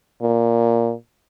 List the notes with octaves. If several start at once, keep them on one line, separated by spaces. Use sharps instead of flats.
A#2